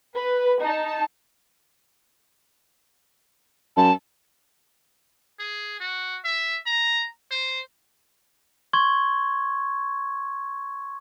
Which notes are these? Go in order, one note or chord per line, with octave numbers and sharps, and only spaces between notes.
B4
D#4 A5
F#2 A5
G#4
F#4
E5
A#5
C5
C6 C#6 G#6